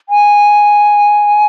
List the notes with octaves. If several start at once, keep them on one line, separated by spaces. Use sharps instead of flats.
G#5